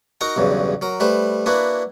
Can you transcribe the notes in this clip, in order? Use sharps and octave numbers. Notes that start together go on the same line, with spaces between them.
D#4 F#4 A#4 A#5
B1 E2 G2 C#3
F#3 A#4
G3 A3 B4 C5
A#3 D4 E4 F#4 B4